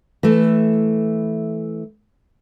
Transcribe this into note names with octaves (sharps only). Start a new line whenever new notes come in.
E3 A3